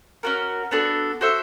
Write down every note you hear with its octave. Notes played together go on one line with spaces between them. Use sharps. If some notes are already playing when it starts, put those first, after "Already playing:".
C#4 F#4 A#4
B3 D4 F#4 A4
F#4 A4 C5 E5